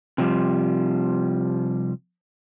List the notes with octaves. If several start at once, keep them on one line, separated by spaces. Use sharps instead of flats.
C3 F3 G3